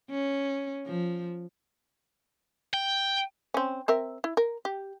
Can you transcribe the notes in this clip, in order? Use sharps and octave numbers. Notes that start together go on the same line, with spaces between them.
C#4
F3
G5
C4 C#4
C4 A#4 E5
E4
A#4
G4